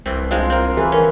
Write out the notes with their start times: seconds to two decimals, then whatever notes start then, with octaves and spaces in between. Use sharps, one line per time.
0.06 C2 E3 C4
0.31 G#3 C4 D4 F4
0.50 C4 A#4
0.77 E3 G#4 B4 E5
0.92 C#4 A#4 C6